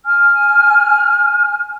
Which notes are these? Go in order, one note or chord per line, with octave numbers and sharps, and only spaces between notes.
G#5 F6